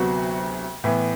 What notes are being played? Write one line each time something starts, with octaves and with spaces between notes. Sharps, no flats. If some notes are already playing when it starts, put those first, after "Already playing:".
Already playing: D2 C3 F#3 B3 F#4
A2 E3 B3